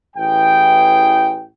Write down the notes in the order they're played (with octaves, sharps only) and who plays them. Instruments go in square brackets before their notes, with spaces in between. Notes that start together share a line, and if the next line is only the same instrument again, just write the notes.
[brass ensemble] A1 E3 G#4 G5